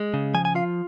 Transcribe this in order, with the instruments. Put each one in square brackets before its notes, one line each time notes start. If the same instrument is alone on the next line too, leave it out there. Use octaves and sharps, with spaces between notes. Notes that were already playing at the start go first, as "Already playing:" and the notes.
Already playing: [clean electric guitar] G#3
C#3
F3 G#5
G#5
F4 F5